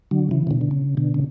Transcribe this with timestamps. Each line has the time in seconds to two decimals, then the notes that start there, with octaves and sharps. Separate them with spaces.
0.11 D3 F#3
0.31 C#3 E3
0.47 C#3
0.51 B2 D3
0.61 D3
0.71 C#3
0.97 B2 D3
1.14 C#3